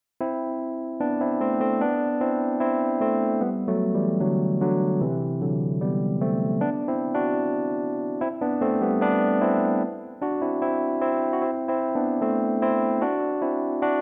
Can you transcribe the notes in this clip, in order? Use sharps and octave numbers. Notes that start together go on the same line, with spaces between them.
C4 E4
B3 D4
C4 E4
A3 C4
A3 C4
B3 D4
C4 E4
C4 E4
A3 C4
G3 B3
F#3 A3
E3 G3
D3 F#3
D3 F#3
C3 E3
D3 F#3
G3 B3
A3 C4
B3 D4
C4 E4
D4 F#4
C4 E4
B3 D4
A3 C4
G3 B3
B3 D4
C4 E4
D4 F#4
C4 E4
C4 E4
C4 E4
F#4
C4 E4
C4 E4
B3 D4
A3 C4
C4 E4
D4 F#4
C4 E4
D4 F#4